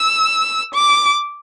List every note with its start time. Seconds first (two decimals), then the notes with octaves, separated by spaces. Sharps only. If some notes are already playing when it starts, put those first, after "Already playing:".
Already playing: E6
0.74 D6